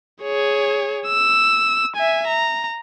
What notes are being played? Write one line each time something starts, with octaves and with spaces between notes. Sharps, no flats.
G#4 C#5
E6
E5 G#5
A#5